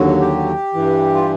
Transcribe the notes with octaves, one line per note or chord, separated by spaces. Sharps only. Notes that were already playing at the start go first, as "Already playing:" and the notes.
Already playing: D#2 D3 F#3
G4
G2 E3
F4